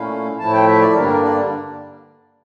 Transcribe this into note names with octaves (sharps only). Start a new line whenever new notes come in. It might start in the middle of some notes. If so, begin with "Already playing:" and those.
Already playing: A#2 A3 C#4 E4 F5
A2 F3 A3 E4 A5
G5
E5
D5
G2 D3 G3 A#3 D4 A#4
A#4
D5